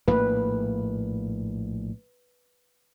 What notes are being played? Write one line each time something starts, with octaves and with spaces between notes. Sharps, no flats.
A#1 A2 A#3 B4